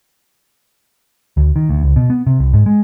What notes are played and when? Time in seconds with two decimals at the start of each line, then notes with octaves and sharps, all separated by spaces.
1.37 D2
1.56 D#3
1.69 D2
1.83 C#2
1.96 B2
2.10 B3
2.27 C3
2.39 C2
2.53 G#2
2.66 G#3